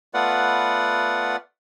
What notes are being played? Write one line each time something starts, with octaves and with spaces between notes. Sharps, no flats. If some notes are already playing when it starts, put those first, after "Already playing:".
A3 B3 F4 B4 D5 F#5